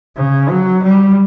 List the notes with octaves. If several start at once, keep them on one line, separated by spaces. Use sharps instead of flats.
C#3
F#3
G3